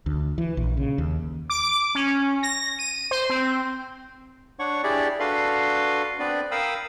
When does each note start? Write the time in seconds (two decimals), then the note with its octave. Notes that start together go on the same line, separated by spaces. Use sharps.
0.06 D2
0.38 E3
0.57 A#1
0.77 C#3
0.98 D#2
1.50 D6
1.95 C#4
2.43 A#6
2.79 D#7
3.11 C5
3.30 C4
4.59 D4 C#5 F#5 C#6
4.84 D4 E4 G4 G#4 D5
5.20 D4 F#4 A4 B4 F5 C6
6.19 B3 C4 D4 B4 D5
6.51 A#4 F5 G5 B5 D#6 E6